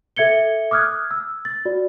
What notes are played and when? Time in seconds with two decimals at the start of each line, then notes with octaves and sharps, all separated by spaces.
0.16 A4 E5 G#6 C#7 G7
0.71 D6 D#6 F6 F#6 G#6
1.11 E6
1.45 A6
1.65 F#4 D5